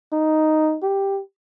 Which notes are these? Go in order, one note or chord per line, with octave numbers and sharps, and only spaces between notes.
D#4
G4